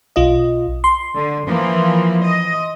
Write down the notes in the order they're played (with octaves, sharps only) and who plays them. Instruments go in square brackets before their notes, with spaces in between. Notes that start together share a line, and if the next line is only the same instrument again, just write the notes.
[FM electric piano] B1 F4 D#5
C6
[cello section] D3
E3 F3 A#3
D#5